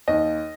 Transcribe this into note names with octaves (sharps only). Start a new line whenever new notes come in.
D#2 D#5